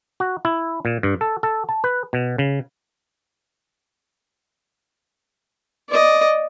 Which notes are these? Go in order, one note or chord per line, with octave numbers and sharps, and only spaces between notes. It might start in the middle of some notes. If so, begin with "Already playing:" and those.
F#4
E4
A#2
G2
A4
A4
A5
B4
B2
C#3
D5 D#5